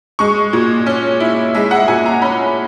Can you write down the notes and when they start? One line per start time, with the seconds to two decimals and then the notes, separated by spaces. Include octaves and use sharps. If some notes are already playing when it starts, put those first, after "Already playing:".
0.19 G#3 C#6
0.53 A#2
0.86 C#4
1.20 E4
1.55 G#3 E5
1.71 F#5
1.88 A#2 G#5
2.06 A#5
2.22 C#4 B5